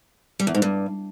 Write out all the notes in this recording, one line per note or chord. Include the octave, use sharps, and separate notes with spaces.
G3
E2
G#2
G2